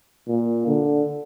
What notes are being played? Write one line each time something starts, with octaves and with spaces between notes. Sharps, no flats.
A#2
D3